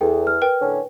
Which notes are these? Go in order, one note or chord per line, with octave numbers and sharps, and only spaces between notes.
E2 A4 G5
F6
A#4 B4 G5
A2 D3 C#4